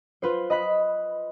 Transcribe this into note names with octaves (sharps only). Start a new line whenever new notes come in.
F4 B4 C5
D#5 B5 F#6 B6